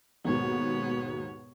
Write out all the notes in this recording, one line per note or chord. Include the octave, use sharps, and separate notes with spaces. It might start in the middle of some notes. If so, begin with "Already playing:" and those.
D#2 G#2 B2 B3 C#5